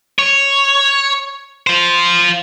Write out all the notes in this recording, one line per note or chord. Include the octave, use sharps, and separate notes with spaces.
C#5
F4 C5